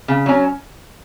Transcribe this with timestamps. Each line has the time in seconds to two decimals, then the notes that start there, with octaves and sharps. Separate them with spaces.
0.08 C#3
0.26 F#3 C#4